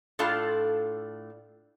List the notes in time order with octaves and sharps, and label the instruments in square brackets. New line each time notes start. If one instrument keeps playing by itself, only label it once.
[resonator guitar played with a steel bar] A2 D4 F4 A4 F5 A5